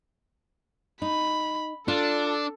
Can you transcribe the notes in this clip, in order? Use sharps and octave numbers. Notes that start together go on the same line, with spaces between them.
D#4 B5
D4 F4 A4